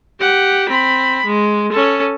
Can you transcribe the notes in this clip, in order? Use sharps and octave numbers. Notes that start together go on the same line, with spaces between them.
G4 F#5
C4 B5
G#3
C#4 A4